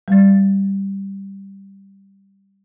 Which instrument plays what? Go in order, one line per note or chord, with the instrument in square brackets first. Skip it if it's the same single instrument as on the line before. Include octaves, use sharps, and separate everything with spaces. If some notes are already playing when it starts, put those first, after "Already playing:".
[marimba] G3 A6